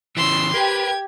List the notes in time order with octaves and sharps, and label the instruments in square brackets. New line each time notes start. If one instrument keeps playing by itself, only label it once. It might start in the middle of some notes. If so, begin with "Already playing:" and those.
[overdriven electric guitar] C#3 E3 [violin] C6 E6
[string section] G4 [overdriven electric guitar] A#4 B4 [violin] G#6